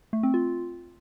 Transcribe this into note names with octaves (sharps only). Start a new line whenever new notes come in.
A3
C4
F4